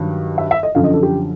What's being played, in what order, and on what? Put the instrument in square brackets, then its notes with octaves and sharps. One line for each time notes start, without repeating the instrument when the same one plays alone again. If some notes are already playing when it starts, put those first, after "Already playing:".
Already playing: [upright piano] G2 D#3 F#3
E5
E5
D#5
F#2 D3 F3 F5
D#5
A4
G4